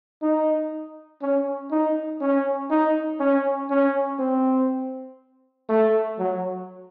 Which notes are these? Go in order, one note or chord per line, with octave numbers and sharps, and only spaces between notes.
D#4
C#4
D#4
C#4
D#4
C#4
C#4
C4
A3
F#3